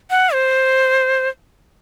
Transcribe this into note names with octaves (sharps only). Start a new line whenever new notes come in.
F#5
C5